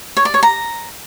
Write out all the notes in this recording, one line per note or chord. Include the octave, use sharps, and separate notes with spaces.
C#5
D5
C#5
A#5